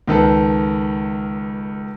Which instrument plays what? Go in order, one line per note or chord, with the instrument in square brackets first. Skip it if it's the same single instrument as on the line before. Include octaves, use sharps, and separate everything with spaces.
[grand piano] C#2 D#3 A4 B4